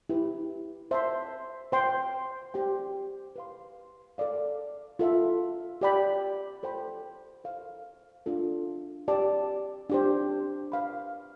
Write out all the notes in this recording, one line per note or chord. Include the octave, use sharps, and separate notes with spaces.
E4 G4 B4
C5 E5 A5 C6
C5 G5 C6
G4 C5 G5
B4 F5 C6
A4 D5 F5
F4 A4 E5
G4 D5 G5 B5
A4 C5 G5 B5
A4 C5 F5
D4 F4 A4
G4 D5 A5
D4 G4 C5
B4 F5 B5